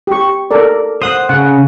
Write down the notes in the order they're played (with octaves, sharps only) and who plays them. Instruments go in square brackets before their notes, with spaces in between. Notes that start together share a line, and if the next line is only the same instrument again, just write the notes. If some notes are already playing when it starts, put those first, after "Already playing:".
[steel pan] G4 C#6
A4 A#4 D5
[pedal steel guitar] C5 F#5 [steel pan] D#6
[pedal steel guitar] C#3 [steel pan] F#5